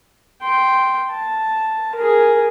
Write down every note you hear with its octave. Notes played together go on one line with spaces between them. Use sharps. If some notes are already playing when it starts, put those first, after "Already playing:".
G5 C6
A5
G#4 A#4